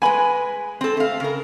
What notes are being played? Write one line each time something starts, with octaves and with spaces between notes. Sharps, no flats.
G#3 B4 G#5 B5
C4 A4
A3 F5
C#3 A#4